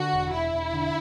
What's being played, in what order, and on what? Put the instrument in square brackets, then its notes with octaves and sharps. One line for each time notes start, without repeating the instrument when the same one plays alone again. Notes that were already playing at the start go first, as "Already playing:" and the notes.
Already playing: [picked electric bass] D3 [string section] F#4
[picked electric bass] E1
[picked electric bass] E1 [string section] E4
[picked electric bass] E1
D3